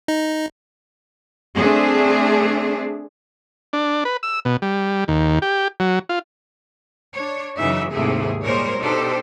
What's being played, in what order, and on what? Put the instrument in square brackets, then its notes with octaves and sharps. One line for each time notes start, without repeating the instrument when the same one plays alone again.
[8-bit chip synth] D#4
[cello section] A3 C4 D4 G#4
[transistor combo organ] D4
B4
E6
B2
G3
D#2
G4
F#3
F4
[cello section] D4 C#5
F#2 C#3 E3 D#4 E5
D#2 G#2 C3 A3 E4 G#4
A#2 G3 G#3 A#4 C5 C#5
B2 D4 D#4 G4 A4 C5